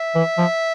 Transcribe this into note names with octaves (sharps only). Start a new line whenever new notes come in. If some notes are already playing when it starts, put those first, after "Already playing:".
Already playing: E5
E3
F3